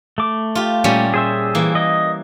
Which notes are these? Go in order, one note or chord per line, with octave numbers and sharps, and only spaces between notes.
A3 D6
F4 G4
A#2 G3 C#4
G#4 C5 E5
E3 A#3
D#5